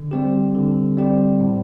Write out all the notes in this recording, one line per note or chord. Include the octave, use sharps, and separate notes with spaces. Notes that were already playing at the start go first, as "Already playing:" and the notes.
Already playing: D3
G3 C4 G4
D3
G3 C4 G4
A2